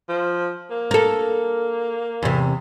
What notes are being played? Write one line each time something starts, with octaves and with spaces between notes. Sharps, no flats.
F3
A#3
A4 A#4
E2 C3